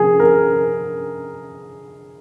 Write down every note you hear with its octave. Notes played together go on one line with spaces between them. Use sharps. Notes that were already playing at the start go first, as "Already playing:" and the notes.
Already playing: C3 F3 A#3 C#4 G#4
A#4